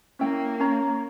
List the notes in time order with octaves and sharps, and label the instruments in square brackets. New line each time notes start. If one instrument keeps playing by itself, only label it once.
[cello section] A#3 [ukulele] C#4 E4 G5
[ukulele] C#4 C#5 A#5